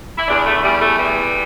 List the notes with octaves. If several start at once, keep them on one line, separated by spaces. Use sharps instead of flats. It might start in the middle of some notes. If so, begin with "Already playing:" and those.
E4
E2 D4
A3
E2 G3
A3
E3 G3